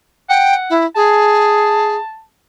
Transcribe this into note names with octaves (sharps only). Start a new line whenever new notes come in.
F#5 G5
E4
G#4 A5